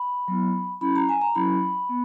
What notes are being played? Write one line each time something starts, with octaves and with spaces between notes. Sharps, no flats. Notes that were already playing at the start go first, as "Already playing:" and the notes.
Already playing: B5
F#3 B3 E4
F#3 C#4 E4 B5
A#5
G#5
A#5
F#3 C#4 E4 B5
B3